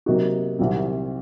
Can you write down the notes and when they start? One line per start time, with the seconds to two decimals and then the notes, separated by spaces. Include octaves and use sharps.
0.06 C3 F#3 A#3 D#4 F#4
0.59 C2 C3 D#3 F#3 C4